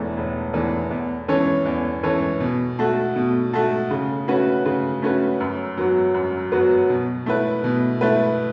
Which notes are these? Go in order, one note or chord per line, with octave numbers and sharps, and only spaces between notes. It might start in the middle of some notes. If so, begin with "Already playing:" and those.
Already playing: E1 E2 E3 A3
E1
E2 E3 A3
E2
E3 C#4 A4 C#5
E2
E3 C#4 A4 C#5
B2
A3 F#4 A4
B2
A3 F#4 A4
C#3
A3 C#4 F#4 B4
C#3
A3 C#4 F#4 B4
F#2
F#3 B3 F#4
F#2
F#3 B3 F#4
B2
A3 E4 B4
B2
A3 E4 B4